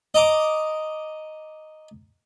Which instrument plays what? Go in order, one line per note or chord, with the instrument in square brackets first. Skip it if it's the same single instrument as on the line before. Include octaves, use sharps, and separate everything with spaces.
[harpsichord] D#5 A#5 D6 D#6